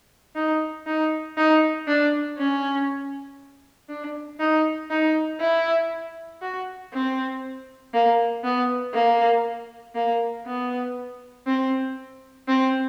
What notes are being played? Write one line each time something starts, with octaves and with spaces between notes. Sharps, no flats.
D#4
D#4
D#4
D4
C#4
D4
D#4
D#4
E4
F#4
C4
A#3
B3
A#3
A#3
B3
C4
C4